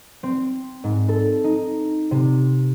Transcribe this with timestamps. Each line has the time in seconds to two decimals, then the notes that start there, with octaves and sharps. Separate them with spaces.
0.23 C4
0.84 G#2
1.09 A4
1.44 D#4
2.11 C3